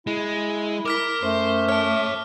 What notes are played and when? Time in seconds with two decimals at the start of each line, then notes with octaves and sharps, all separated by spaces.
0.07 G#3 E4
0.86 A#4 D6 F6 B6
1.22 F#2 A3 C5
1.69 C#5 A5 F6